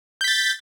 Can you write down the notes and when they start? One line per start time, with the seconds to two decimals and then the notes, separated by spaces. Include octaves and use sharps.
0.21 G6
0.24 B6
0.28 A6